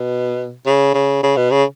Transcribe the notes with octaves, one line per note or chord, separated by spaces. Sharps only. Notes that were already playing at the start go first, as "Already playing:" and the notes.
Already playing: B2
C#3
C#3
C#3
B2
C#3